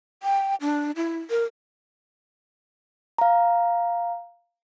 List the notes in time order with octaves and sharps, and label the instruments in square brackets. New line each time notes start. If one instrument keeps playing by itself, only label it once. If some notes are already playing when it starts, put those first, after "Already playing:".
[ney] G5
D4
E4
A#4
[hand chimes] F5 A#5